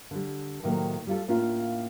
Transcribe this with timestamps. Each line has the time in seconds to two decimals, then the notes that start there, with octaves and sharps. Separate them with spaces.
0.11 D3 G3
0.64 A2 C3 D#3 F#3 A#3
1.07 G3 F4 A4
1.28 A2 A#3 C#4 D4 F4 F5